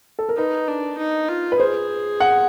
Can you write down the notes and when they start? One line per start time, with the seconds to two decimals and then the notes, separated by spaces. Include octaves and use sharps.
0.19 A4
0.29 A#4
0.37 D#4 B4
0.67 D4
0.98 D#4
1.28 F4
1.52 B4
1.59 G#4 C5
2.20 F#5